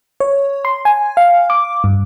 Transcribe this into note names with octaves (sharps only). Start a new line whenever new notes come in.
C#5
C6
G#5
F5
D6
G2